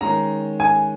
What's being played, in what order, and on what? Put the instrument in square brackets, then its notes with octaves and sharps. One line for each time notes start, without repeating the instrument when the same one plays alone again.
[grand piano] D#3 G#3 C#4 [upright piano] A#5
[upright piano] G#5